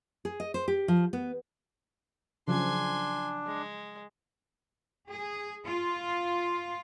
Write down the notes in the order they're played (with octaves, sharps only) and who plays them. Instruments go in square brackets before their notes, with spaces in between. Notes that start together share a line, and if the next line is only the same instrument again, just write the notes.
[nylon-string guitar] G#4
D#5
C5
G4
F3
B3
[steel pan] C#3 F3 F#3 [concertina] D4 [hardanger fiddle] G#5 C6
[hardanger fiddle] G#3
[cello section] G#4
F4